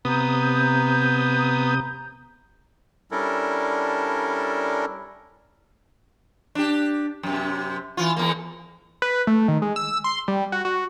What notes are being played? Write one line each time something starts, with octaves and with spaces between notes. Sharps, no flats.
C3 B3 A#5 D#6 G6
G3 C#4 D4 E4 A4 A#4
D4 G4
F#2 C3
E3 F4
E2 A#3
B4
A3
D#3
G#3
E6
C6
G3
F#4
F#4